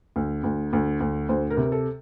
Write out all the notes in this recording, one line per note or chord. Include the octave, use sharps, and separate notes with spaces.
D2
D2
D2
D2
D2 C5
A#4
C3
A#4
A4